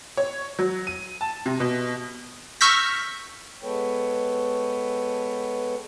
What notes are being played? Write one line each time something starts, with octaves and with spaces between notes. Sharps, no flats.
C#5
F#3
D#7
A5
C3
B2
C#6 E6 F6 G6 A#6 B6
G#3 B3 A4 B4 C#5 G5